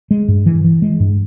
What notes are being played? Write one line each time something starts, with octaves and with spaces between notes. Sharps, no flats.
G#3
G2
E3
E3
G#3
G2